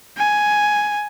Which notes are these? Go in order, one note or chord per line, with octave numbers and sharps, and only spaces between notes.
G#5